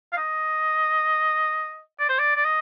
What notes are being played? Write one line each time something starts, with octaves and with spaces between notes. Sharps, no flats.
F5
D#5
D5
C5
D5
D5
D#5